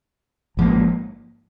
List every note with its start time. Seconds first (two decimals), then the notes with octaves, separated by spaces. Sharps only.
0.57 G#1 G#2 F3 A#3